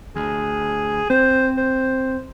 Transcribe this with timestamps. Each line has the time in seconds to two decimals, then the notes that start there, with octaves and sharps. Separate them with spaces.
0.16 D2 G#4
1.10 C4 C5
1.58 C5